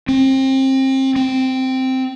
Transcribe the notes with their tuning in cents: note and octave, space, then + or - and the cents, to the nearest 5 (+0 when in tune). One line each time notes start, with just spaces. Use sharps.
C4 +30
C4 -5